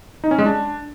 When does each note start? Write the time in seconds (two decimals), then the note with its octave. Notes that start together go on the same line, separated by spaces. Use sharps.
0.24 D#4
0.31 C#4
0.38 G#3
0.46 D4